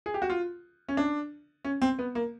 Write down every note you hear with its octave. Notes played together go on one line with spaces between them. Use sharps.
G#4
G4
F#4
F4
C#4
D4
C#4
C4
B3
A#3